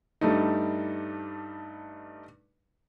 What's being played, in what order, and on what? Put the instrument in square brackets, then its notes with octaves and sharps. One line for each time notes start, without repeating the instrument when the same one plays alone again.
[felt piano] G2 G3 A3 D#4